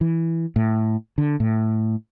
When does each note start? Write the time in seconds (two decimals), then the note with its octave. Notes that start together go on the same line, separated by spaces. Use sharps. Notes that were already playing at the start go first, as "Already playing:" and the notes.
0.01 E3
0.56 A2
1.18 D3
1.40 A2